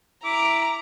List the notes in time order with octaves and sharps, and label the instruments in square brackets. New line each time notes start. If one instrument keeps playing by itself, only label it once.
[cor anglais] E4 [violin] A#5 [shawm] D6